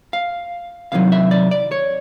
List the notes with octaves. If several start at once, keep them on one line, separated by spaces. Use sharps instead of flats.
F5
C2 C3 D#3 F#3 F5
E5
D5
D5
C#5